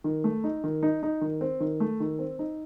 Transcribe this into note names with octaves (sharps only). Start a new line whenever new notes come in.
D#3
A3
D#4
D#3
D#4
D#4
D#3
C4
D#3
A3
D#3
C4
D#4